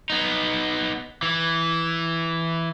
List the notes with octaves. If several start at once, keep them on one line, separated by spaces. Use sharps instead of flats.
B3 D#4
E3